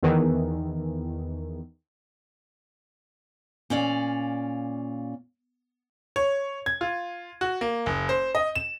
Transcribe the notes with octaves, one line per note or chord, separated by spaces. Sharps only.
E2 D#3 E3
A#2 C#4 D5 F5
C#5
G#6
F4
F#4
A#3
F#1
C5
D#5
E7